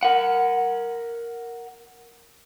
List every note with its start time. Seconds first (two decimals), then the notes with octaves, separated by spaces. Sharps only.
0.03 A#4 F#5